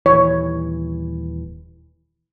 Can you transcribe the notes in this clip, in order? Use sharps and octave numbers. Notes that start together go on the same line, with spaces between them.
D#1 E3 C#5